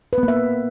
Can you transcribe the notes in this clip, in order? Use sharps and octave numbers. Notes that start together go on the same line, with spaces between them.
B4
B3
A#3
E5